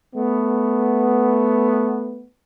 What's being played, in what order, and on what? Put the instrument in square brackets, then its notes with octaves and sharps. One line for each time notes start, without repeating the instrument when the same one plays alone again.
[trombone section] A3 B3